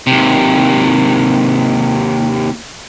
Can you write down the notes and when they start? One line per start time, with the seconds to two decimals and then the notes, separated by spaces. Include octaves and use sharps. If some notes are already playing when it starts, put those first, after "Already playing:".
0.07 D#2 C3